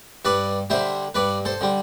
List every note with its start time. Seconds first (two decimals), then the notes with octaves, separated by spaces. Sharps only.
0.25 G2 B4 D5
0.70 D3 G3 C5 E5
1.15 G2 B4 D5
1.45 A4 C5
1.61 D3 G3